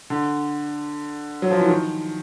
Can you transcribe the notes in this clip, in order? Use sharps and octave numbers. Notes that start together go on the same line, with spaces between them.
D3
F#3
F3
E3
D#3